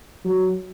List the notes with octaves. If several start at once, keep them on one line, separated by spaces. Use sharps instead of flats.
F#3